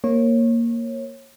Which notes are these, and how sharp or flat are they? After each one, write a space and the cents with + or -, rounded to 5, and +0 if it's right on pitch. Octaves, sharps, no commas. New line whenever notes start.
A#3 +0 C#5 -25